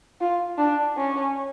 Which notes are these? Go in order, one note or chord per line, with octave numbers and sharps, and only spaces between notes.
F4
D4
C#4